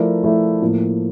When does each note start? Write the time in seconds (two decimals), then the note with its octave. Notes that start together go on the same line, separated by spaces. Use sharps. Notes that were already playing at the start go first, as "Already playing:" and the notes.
Already playing: F3 A3 E4 A#4 D5
0.23 F3 A3 E4 A#4 D5
0.62 A2 F3 A#3